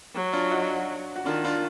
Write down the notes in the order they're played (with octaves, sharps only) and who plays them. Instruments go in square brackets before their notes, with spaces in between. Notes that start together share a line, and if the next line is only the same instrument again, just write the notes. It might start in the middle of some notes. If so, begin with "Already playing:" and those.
[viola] F#3
[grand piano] D4 F4
D#4 F#4
F#4
[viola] D#3 [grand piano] D4 F4
[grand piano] D4 F4